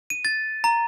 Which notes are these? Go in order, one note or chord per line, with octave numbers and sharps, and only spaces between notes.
D#7
A6
A#5